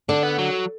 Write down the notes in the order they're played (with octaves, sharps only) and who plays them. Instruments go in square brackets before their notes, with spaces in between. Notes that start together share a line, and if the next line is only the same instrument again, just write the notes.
[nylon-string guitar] D3 [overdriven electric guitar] D4
[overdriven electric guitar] B3
F#3